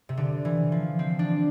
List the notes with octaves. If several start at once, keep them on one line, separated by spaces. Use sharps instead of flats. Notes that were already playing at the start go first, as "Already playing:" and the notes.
C3
D3
E3
F3
C4
D4